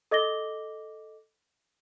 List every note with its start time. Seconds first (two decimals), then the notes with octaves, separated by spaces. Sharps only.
0.11 A4 D#5 D6 A#6 G7